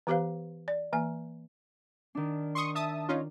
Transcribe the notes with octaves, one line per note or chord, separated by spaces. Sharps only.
E3 B3 G4 B4 C5 F5
D5
E3 A#3 G#5
D#3 D4
C6 C#6 D#6
E5 A5 D#6
C#4 D#4 F4